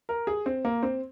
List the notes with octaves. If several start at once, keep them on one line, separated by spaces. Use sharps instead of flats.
A#4
G#4
C4
A#3
C4